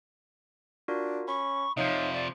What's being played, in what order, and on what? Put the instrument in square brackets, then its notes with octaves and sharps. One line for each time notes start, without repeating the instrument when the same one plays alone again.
[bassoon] D4 [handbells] F4 F#4 A#4
[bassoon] C#4 [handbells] B5 [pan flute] C#6
[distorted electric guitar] C3 F3 [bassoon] D#4 [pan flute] C#5 [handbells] E5 F5 G6
[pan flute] D5